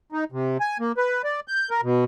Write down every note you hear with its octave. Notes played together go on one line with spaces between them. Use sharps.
D#4
C3
G#5
A#3
B4
D5
G6
A#4
B2